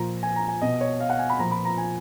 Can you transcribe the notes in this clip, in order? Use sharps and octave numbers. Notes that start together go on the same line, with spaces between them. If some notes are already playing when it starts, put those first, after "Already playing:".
Already playing: A#2 F3 A#5
G#5
A#5
G#5
B2 D#5
C#5
F5
F#5
G#5
B5
A#2 F3 A#5
B5
A#5
G#5